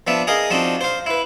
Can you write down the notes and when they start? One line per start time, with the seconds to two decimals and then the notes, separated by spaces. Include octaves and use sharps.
0.07 F3 B3 D4 E5
0.27 G#4 A#4 D#5 F5
0.50 F3 C4 D4 D#4 F#4
0.81 C5 F5
1.06 E4 B4